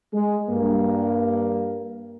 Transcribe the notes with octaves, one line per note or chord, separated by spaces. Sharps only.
G#3
G2 A#3